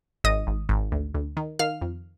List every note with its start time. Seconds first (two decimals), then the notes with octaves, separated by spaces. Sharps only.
0.24 G#1 D#5 D#6
0.47 G#1
0.69 G#1
0.92 D2
1.14 D2
1.37 D#3
1.59 D#3 F5 F6
1.82 F2